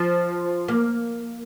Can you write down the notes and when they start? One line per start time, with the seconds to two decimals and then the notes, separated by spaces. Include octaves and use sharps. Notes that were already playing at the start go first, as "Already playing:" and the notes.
Already playing: F3
0.68 A#3